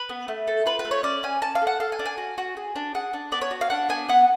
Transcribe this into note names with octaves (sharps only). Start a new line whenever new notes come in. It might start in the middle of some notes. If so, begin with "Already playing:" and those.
Already playing: B4
B3
A3
A4
F4 B4
B4
A3
C#5
C#4 D5
C#4 G#5
C#4 A5
F5
A4
F#5
A4 F5
G#5
D4
G#5
F#4
F#4
G#4
D4
G#4 F#5
D4
B3 D5
C#5
F#4
F5
D4 F#5
B3 G#5
B3 F#5